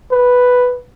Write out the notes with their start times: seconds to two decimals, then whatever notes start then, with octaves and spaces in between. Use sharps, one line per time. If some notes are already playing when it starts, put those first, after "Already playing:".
0.11 B4